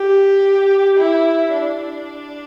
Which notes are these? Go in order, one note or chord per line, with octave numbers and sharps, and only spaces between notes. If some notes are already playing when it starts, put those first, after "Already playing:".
Already playing: G4
E4
D4